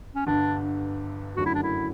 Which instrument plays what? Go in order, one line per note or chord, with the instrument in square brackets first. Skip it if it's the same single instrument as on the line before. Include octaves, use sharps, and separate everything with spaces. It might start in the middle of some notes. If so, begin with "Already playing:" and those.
[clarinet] C#4
[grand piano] G1 G2 D3 [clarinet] D4
[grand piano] F#1 F#2 D3 F#3 A3 [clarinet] F#4
[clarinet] E4
D4
E4